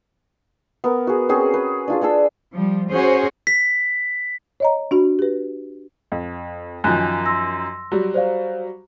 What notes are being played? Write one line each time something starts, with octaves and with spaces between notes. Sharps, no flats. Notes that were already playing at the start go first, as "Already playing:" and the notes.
B3 A#4
F#4 G#4
C4 C#4 F#4 G#4
B4
D4 F4 G#4
D4 G#4 A4 E6
F3 G3
C#4 F#4 G#4 C5
B6
C#5 D#5 A#5
D4 F#4 B5
G4 B4
F2
F#2 D#3 F3 G#5 F#6
C6 E6 A#6
F#3 G3
C5 D5 F5